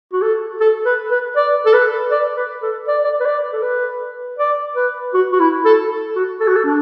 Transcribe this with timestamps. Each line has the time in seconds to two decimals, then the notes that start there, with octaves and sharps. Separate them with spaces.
0.13 F#4
0.22 A4
0.60 A4
0.86 B4
1.11 B4
1.36 D5
1.66 A4
1.73 B4
2.11 D5
2.36 B4
2.63 A4
2.88 D5
3.04 D5
3.20 B4
3.26 D5
3.53 A4
3.62 B4
4.39 D5
4.76 B4
5.14 F#4
5.32 F#4
5.40 E4
5.65 A4
6.15 F#4
6.40 A4
6.47 F#4
6.56 A4
6.65 D4